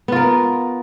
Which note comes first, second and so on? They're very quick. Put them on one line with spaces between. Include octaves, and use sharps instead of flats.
B3 F4 A#4